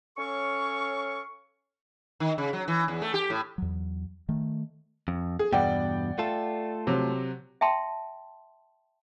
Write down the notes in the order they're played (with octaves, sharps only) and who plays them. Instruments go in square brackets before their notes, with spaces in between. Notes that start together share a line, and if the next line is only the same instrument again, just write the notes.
[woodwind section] C#4 A4 C#5 F5 C#6
[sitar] D#3
C#3
F#3
E3
E2
A3
G4
A2
[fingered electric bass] E2 F#3
D#3 A3
[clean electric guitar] F2
[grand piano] G#4
[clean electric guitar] E2 G2 B2 [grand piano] D5 F#5 G5
[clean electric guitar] A3 F4 A4
[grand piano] C3 F#3
[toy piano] E5 G5 A5 C6